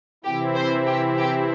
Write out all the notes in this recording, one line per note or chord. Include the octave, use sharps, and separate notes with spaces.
C3 E3 C4 E4 G4
C5
G4
G4